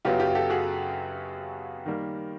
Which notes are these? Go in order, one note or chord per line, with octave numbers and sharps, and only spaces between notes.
F#2 C#3 F#3 B3 F4 G4
F4 G4
G4 A4
F#4 G#4
D#3 G3 A#3